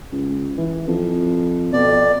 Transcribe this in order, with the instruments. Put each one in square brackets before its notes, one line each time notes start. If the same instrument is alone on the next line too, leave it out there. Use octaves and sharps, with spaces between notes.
[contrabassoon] C#2
E3
F2
[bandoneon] F2 D5 [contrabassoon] B2